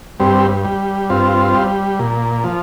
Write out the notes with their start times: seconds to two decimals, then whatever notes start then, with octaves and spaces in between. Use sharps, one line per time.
0.20 G2 G3 C4
0.65 G3
1.10 G2 C4 F4
1.55 G3
1.99 A#2
2.44 F3